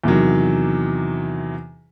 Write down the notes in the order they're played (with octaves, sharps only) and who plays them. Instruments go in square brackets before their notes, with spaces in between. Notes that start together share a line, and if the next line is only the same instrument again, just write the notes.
[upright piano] E2 C3 D#3 F#3